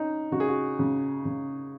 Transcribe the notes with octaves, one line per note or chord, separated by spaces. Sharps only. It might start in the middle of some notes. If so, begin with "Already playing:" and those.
Already playing: C#4 D#4
C#3 F#4
G#4
F#4
C#3
C#3